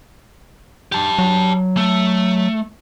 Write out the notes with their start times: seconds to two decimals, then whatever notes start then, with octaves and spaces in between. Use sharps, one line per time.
0.92 G4 A5
1.19 F#3
1.77 A3